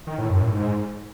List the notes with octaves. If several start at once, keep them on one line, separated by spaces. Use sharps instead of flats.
D#3
A2
F#2
A2
G#2